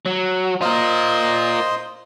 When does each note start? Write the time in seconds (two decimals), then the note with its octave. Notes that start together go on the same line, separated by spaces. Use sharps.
0.06 F#3
0.61 F4 A#4 C5 D#5 C6